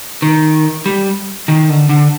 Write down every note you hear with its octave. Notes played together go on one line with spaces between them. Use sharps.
D#3
G3
D#3
D3
D3